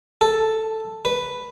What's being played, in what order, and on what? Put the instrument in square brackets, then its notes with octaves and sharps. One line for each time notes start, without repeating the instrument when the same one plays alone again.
[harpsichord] A4
B4